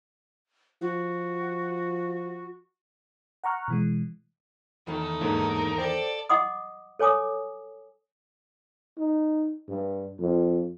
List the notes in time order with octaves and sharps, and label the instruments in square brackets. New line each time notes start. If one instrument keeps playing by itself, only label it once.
[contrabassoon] F3 [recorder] F#4
[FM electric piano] F#5 A#5 C#6 F6 F#6
B2 E3 G#3
[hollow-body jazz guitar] E2 D#3 [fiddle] A3 D#4
[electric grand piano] D#2 G#2 D3 [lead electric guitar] A#4
[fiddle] A4 D5 [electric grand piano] C5 G5
[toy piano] D#5 F#5 C6 D6 D#6
A4 C#5 G#5 D6 D#6
[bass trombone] D#4
G2
F2